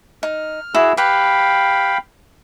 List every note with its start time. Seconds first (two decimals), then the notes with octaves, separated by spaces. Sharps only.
0.23 D#4 F6
0.74 E4 F#4 G#4
0.97 G4 B4 F5 G5 B5